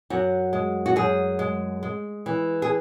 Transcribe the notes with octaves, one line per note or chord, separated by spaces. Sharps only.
F#2 F#4
G#3
F#4
F#2 G#4
G#3
G#3
E3
G#4